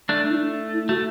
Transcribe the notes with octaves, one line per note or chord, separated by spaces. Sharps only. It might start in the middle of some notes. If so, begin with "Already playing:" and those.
A3 D4
A3 D4
E4
D4
E4
A3 F#4